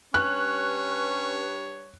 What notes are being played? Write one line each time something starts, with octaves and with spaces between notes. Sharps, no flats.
G2 C#4 B4 C#5 F#6